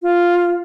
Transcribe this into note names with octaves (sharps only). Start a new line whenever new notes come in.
F4